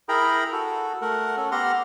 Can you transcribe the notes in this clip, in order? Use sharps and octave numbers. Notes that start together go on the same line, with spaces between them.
E4 G#4 A#4 G5 A#5 B5
F#4 A4
A3 A#4 F#5
C#4 A4
B3 G4 F#5 A#5 C6 F6